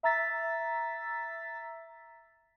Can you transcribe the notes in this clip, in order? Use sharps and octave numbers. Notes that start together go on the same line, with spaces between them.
E5 A#5 E6 A6 B6